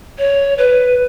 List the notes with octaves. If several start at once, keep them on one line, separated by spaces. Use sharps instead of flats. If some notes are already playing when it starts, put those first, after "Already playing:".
C#5
B4